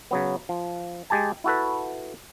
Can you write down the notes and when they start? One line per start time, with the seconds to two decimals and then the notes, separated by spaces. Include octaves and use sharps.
0.11 C#3 F#3 B3
0.49 F3
1.10 G#3 G4 G#5 A5
1.44 E4 F#4 A4 B4